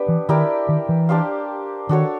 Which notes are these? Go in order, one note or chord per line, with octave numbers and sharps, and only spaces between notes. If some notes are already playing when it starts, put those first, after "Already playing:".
Already playing: B3 D4 G4 B4
E3
D#3 E4 G4 A#4 D5
D#3
E3
D4 G4 C5 F5
D#3 D4 F#4 A4 C#5